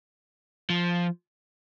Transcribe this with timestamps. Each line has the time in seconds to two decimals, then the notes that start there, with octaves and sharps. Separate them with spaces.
0.70 F3